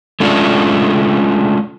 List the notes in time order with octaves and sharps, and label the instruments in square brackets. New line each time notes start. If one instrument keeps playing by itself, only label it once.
[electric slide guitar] G#3 A3 C#4 D4 F4